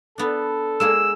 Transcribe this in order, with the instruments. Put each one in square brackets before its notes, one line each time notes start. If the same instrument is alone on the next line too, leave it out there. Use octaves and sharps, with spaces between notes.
[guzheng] B3 D4 [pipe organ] A4
[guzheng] G#3 A#3 G#4 [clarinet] E6